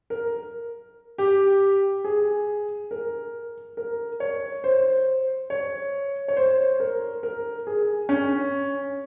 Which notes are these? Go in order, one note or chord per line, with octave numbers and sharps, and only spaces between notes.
A#4
G4
G#4
A#4
A#4
C#5
C5
C#5
C#5
C5
A#4
A#4
G#4
C#4